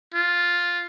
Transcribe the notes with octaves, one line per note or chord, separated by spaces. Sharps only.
F4